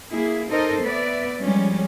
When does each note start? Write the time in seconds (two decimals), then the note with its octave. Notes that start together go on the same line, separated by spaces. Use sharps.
0.12 A#3 E4 G#4
0.51 D#4 A4 A#4 C5 D#5
0.81 B3 B4 D5 E5
1.41 F3 G3 G#3 C#4